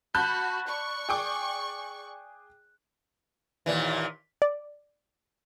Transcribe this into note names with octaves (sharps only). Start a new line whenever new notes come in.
F#4 A5 B5 F#6 G6
D5 C#6
G#4 G5 D6
D#2 A#2 E3
D5